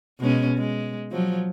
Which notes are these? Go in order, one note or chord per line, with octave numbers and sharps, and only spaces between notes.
B2 G#3 C#4
G#3
F3 F#3